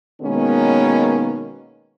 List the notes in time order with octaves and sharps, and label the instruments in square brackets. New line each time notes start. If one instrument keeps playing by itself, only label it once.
[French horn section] B2 D#3 G#3 A#3 B3 C#4